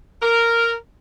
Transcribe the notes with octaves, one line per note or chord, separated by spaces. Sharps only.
A#4